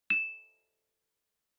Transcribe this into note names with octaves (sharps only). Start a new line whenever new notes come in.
E7